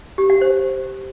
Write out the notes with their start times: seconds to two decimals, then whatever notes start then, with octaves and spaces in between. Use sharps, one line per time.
0.18 G4
0.30 F#5
0.41 C5